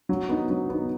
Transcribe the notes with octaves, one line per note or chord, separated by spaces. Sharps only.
F#3
B3 D#4
F#3
B3 D#4